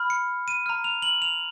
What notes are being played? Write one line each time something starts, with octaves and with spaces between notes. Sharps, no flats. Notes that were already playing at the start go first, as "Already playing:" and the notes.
Already playing: B5 F6
C#7
D#7
A#5 F6
F7
F#7
F7